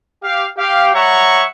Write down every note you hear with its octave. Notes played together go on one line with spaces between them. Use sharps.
G4 F5
G4 F5
G3 C#5 E5 F#5 A#5 C#6